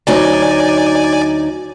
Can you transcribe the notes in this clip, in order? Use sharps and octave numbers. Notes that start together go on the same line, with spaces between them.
D2 F#3 D#4 D5 G#5